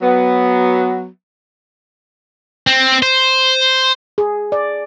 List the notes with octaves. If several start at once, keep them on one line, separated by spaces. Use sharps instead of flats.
F#3 B3
C4
C5
G#4
D5